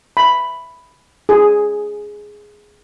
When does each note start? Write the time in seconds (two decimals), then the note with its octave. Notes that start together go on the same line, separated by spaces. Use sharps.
0.17 B5
1.29 G#4